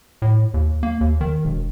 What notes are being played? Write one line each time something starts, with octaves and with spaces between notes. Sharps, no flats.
A2
D#2
A#3
D#2
D#3
E1